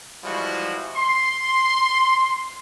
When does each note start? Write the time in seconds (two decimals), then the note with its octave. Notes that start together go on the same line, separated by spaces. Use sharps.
0.24 E3 F3 G3 G#3 E4 F#4
0.97 C6